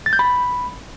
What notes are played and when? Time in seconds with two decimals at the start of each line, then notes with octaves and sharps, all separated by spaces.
0.06 A6
0.13 G6
0.19 B5